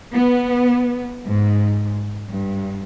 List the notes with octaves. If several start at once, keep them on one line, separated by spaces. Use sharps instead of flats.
B3
G#2
G2